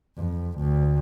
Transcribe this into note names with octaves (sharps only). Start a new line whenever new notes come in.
F2
D2